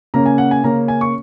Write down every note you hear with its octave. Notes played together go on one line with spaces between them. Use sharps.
C#3 A#3 C#4 A#5
G#5
F#5
G#5
C#3 A#3 C#4 A#5
G#5
C#6